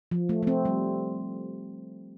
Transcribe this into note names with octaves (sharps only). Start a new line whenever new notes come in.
F3
A3
A3
C4
G3